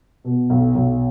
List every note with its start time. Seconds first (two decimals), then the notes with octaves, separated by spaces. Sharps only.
0.24 B2
0.50 B1
0.75 B1